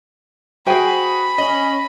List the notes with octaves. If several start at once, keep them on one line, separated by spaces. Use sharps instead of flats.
F#4 G#4 C5 G5 G#5 B5
C#4 D#5